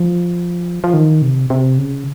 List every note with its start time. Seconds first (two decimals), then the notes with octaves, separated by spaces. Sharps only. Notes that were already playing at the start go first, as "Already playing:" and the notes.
Already playing: F3
0.84 F3
0.94 D#3
1.22 C3
1.50 C3
1.78 C#3